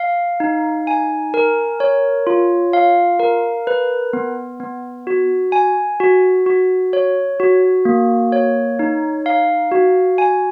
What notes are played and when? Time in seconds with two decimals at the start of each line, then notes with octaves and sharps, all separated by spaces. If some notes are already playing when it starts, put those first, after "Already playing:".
Already playing: F5
0.40 D#4
0.87 G#5
1.34 A#4
1.80 C#5
2.27 F4
2.73 F5
3.19 A#4
3.67 B4
4.13 B3
4.60 B3
5.07 F#4
5.52 G#5
6.00 F#4
6.46 F#4
6.93 C#5
7.40 F#4
7.85 A#3
8.32 C#5
8.79 D#4
9.26 F5
9.71 F#4
10.18 G#5